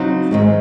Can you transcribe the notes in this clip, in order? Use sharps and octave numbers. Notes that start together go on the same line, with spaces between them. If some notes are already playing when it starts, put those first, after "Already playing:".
Already playing: C#3 F#3 C4 D#4
G#2 D#3 G#3